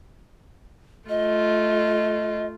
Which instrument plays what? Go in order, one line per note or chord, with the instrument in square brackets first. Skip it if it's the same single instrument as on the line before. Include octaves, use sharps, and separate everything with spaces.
[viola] A3 F4 [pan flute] D#5